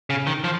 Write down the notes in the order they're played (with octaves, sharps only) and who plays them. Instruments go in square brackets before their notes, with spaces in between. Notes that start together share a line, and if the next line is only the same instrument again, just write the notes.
[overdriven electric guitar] C#3
D#3
F3